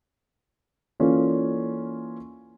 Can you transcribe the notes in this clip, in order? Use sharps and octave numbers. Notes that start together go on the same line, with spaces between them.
E3 A#3 C#4 F4 A4 D5